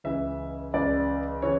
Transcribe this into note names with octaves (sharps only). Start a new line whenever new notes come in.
C#2 C#3 E3 E5
C#2 C#3 E3 D5
C#3 E3 C#5